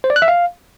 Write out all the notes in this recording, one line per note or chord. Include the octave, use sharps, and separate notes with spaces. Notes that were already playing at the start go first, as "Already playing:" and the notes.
C5
D5
F#6
E5
F5